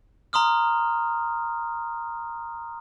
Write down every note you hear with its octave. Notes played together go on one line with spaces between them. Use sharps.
A#5 C6 D#6 F6